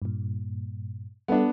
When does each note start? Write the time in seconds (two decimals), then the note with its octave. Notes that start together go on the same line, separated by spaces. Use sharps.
0.02 G2 A#2
1.28 G3 B3 D4 A4